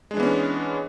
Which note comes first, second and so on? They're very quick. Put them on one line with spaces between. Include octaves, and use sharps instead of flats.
G#3 D4 E3 B3 C#4